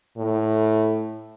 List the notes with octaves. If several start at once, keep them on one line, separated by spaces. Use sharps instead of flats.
A2